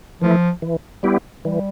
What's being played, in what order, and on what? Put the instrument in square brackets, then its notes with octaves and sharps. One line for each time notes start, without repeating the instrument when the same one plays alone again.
[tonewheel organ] E3 A3 E4 [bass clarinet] F3
[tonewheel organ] E3
G3 B3 E4 G4
[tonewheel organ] E3 [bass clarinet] G3